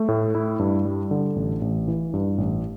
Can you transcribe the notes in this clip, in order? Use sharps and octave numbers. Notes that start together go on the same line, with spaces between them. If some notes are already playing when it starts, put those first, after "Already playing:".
Already playing: A3
A2
E4
G2
G3
D3
A1
A1
E3
G2
A1